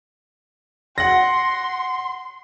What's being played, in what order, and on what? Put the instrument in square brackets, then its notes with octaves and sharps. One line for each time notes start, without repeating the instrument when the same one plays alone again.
[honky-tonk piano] F#5 A#6 [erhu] C6